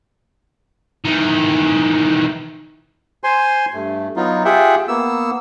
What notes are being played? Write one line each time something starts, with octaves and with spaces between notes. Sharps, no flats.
D#3 E3
C5 G#5 C6
G2 A3
F#3 B3 D#4 F4
F4 G4 G#4 E5 F#5 G5
A#3 B3 E6